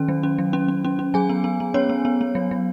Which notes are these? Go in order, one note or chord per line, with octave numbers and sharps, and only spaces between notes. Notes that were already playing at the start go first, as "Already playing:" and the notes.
Already playing: D#3 C#4
F#3
C#4
F#3
C#4
C#4
C#4
C#4
F#3 G#4 G#5
B3
B3
B3
B3 C#4 C#5
B3
B3
B3
F#3
F#3